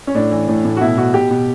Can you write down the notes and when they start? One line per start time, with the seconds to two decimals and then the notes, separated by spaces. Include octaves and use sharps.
0.07 C#4
0.15 A2 D4
0.32 E3
0.48 A2
0.65 A2
0.77 F#4
0.81 B2 E4
0.98 B2 F#4
1.14 B2 G4
1.31 B2